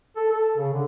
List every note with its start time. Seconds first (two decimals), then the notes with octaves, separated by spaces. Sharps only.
0.16 A4
0.31 A4
0.57 C#3
0.73 D3